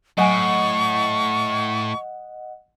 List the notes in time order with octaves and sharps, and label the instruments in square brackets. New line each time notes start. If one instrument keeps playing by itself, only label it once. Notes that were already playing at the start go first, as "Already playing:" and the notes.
[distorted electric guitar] A2 [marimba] F#3 G#5 [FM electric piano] D#5 F#5 [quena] C#6